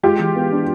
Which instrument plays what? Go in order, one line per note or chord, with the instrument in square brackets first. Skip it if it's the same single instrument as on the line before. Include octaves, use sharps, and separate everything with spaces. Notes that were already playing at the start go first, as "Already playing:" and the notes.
[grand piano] G#3 [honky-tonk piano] F4 G4
[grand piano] E3
B3
D4